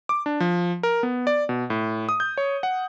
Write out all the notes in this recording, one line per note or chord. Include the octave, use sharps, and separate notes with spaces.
D6
D4
F3
A#4
B3
D5
B2
A2
D#6
G6
C#5
F#5